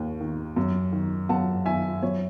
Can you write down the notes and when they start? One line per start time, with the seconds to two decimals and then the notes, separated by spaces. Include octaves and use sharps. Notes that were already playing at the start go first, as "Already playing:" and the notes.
Already playing: D#2
0.21 D#3
0.56 F#2
0.92 D#3
1.29 F#2 F#5 A5
1.65 D#3 E5 G#5
2.02 F#2 C#5